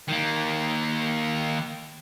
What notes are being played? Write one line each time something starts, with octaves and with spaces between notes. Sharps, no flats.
D#3 A#3